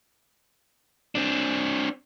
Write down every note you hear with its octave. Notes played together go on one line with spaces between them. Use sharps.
C4 D4